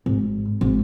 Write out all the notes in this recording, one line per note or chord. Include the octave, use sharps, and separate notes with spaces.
G#1
G#1